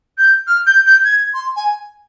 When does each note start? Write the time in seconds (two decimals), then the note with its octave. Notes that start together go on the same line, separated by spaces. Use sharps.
0.18 G6
0.47 F6
0.66 G6
0.86 G6
1.04 G#6
1.34 C6
1.56 G#5